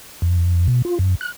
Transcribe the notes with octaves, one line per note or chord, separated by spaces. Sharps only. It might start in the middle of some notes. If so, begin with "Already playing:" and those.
F2
B2
F4
F#2
F#6